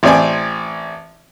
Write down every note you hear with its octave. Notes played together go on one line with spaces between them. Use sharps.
A1 C4 D5 G#5